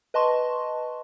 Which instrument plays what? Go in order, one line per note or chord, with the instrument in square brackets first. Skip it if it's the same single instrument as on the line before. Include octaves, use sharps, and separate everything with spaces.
[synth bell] B4 D#5 A5 C6 C#6